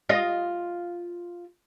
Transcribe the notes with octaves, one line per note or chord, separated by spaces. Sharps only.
F4 D#5